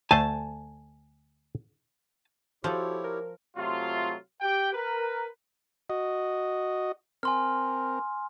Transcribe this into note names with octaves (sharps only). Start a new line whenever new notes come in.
D2 A3 C5 G#5 A5
F3 E4 F#4 G4 A4 C#5
A#4
C3 F#3 A3 F4
G4 G5
A#4 B4
F#4 D#5
C4 A#4 G#5 C6 F6